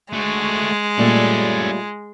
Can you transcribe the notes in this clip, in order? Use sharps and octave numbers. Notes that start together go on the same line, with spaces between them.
G#3 A3 F#4
A#2 G3 A3 C#4 A4